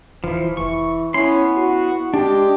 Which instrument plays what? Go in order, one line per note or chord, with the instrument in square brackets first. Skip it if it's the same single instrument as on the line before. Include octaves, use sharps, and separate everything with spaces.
[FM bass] D#1 [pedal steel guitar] E3 F3
[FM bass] F1 [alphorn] E3 [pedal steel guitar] C#6
[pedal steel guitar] B3 C6 [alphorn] C#4 [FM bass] E4
[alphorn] F#4
[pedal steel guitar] G#3 D4 [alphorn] G4